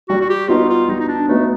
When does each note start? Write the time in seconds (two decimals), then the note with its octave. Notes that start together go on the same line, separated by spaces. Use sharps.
0.09 G3 F#4
0.21 F#4
0.29 G4
0.48 B3 D#4 F4 F#4
0.69 F4
0.88 G3 D#4
1.00 D#4
1.08 D4
1.28 A3 B3 D#4 F#4